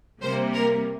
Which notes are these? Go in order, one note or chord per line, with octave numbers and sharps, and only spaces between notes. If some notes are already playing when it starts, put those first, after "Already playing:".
C3 G3 A#3 C5
A#4